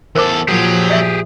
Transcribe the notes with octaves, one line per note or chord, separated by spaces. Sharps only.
E2 A4 A#4 C5 D6
A#2 F3 F#3 G4 G#4
D5 E5